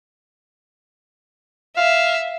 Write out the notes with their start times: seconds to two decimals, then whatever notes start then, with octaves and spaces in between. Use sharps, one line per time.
1.77 E5 F5